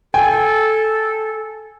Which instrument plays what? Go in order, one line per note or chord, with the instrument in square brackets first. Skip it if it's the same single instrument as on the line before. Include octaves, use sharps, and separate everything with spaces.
[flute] A4 [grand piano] G5 [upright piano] G#5